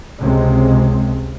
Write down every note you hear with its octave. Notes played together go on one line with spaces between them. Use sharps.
C#2 C3 G#3